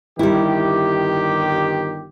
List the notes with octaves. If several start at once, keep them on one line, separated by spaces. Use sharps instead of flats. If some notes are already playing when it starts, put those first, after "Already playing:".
G1 D#3 G3 E4 G4